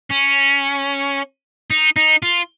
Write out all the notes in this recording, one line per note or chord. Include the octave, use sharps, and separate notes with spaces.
C#4
D#4
D#4
F4